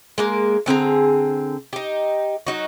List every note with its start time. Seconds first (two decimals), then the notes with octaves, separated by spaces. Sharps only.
0.18 G#3 A#3 A#4
0.66 D3 C4 G#4 A#5
1.73 D#4 G4
2.47 F#3 D#4 F#4